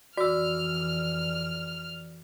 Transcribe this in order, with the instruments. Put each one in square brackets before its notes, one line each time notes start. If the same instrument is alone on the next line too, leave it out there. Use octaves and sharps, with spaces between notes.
[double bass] F2 E3 [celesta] F#4 E6 [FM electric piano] D5 [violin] F6